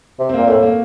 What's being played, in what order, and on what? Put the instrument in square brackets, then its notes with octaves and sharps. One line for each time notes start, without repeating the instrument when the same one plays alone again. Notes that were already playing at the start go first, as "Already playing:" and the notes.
[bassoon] C3
[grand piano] C4
[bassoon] A#2 [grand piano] A#3
[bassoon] A2 [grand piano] A3
[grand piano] A#3